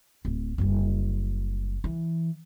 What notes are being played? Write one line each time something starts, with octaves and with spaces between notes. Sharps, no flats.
D1
F#1 G3
E3